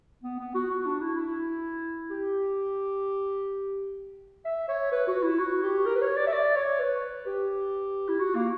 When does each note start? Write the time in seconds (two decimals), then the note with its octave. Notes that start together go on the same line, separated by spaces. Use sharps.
0.23 B3
0.39 B3
0.55 F#4
0.70 F#4
0.86 D4
1.01 E4
1.17 E4
2.10 G4
4.45 E5
4.68 C#5
4.92 B4
5.07 F#4
5.23 E4
5.39 F#4
5.62 G4
5.86 A#4
5.95 B4
6.02 C#5
6.17 D5
6.27 E5
6.33 D5
6.56 C#5
6.79 B4
7.26 G4
8.09 E4
8.20 F#4
8.35 A#3